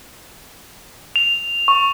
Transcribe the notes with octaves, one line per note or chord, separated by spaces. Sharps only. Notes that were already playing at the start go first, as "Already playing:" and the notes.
F7
C#6